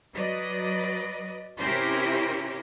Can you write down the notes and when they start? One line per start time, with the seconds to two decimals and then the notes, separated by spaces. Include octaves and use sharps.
0.14 F#3 B4 D5 D#5
1.59 C3 C#4 E4 G4 A#4 C5